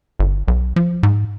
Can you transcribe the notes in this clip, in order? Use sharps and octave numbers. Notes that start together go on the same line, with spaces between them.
G1
B1
F3
G#2